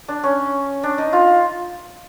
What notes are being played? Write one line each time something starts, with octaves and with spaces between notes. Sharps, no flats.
D4
C#4
D4
D#4
F4